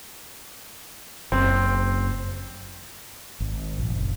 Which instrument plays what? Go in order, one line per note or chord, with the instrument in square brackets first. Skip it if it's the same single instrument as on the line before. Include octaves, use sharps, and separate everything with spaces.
[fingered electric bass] F#1 [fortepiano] C4
[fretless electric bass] G#1
A#1
F#1